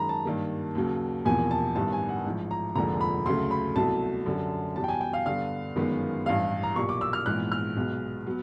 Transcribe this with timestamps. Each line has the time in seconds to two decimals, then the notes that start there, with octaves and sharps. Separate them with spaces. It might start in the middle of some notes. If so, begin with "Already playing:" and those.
Already playing: F#2 D#3 G#3 A#5 B5
0.09 A5
0.25 G2 D#3 G3 A#3
0.75 D#2 C#3 F#3
1.25 E1 E2 C3 F3 A#3 G#5
1.51 A5
1.75 A1 G2 D#3 G3 B3 A5
1.93 G#5
2.09 F#5
2.26 A1 G#2 F3
2.51 A#5
2.75 F1 D#2 D3 F3 G#3 A#5
3.01 B5
3.26 D2 C#3 F#3 A3 C6
3.51 B5
3.76 C2 B2 F#3 A3 A5
4.26 F#2 D3 G3
4.76 E2 B2 G3 A5
4.84 G5
4.88 G#5
5.01 G5
5.13 F5
5.26 G2 D3 G3 B3 F5
5.76 G1 F#2 D#3 G#3 B3
6.26 A1 G2 E3 G3 F5
6.63 A#5
6.76 B1 A#2 G3 A#3 C#6
6.89 D6
7.01 E6
7.13 F6
7.26 A#1 G#2 E3 G#3 B3 F#6
7.52 F6
7.76 B1 B2 G#3 B3
8.26 F#3 B3